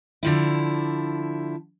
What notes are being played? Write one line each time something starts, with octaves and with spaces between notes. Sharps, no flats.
D3 F3 E4